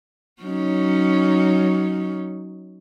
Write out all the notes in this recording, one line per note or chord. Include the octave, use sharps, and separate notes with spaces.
F#3 C#4 D#4